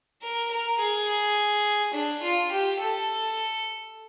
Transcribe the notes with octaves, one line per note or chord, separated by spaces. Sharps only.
A#4
A#4
G#4
D4
F4
G4
A4